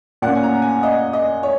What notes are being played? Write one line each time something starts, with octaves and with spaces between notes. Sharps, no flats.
A#2 A#3 C#4 F#5
G#5
A#5
G#5
D#5
D#5
C#5